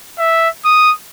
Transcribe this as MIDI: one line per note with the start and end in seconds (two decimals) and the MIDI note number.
0.18 0.49 76
0.65 0.92 87